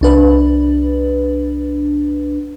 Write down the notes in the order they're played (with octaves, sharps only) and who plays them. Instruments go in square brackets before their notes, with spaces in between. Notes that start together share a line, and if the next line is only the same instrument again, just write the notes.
[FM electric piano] C2 D4 B4